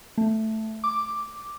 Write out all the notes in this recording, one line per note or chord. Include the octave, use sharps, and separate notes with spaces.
A3
D6